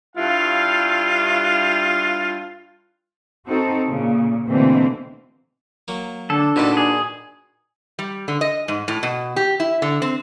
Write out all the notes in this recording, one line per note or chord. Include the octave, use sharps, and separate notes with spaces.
G2 E4 F4 F5
C4 D#4 F#4 A4 C5
A#2 C#3
B2 D3 E3 A3 A#3 C4
F#3 A#3
D3 D4 A4
A#2 D#3 D#4 F#4 B4 D5
G#4
G3
D3
D#5
G#2
A2
B2
G4
E4
D3
C4